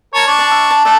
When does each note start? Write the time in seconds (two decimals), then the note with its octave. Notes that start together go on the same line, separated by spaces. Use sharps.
0.14 A#4 C#5 A5
0.27 D4 C#6
0.39 D5 A5
0.51 E5
0.71 A5
0.85 A3 D4 A4